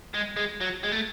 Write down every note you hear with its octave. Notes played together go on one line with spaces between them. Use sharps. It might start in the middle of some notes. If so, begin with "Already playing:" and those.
G#3
G#3
F#3
G#3
A3